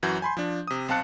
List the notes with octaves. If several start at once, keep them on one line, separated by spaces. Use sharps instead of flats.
F#2 E3 F#3 F#4 G6
G#5 B5 C6
F3 D4
C3 D#6
B1 C4 F5 A5 F#6 C#7